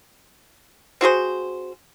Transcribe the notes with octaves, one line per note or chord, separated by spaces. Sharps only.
C4 F#4 G#4 C5